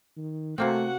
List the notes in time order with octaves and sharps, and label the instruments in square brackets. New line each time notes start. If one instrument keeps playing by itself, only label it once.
[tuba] D#3
[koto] C3 A#3 C4 [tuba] A3 [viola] F#4 F#5